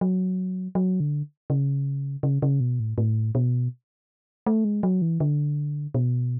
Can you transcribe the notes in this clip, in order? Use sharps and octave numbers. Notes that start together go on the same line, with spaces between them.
F#3
F#3
D3
C#3
C#3
C#3
B2
A2
A2
B2
A3
G#3
F#3
E3
D3
B2